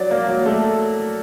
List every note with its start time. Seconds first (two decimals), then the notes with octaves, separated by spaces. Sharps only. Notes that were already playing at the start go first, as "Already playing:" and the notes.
Already playing: F#3 D5
0.11 A#3
0.28 F#3
0.46 A3